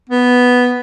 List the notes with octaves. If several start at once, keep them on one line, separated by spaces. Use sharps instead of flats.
B3